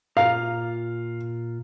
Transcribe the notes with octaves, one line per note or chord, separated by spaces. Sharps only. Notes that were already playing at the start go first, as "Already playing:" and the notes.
A#2 F4 F5 A#5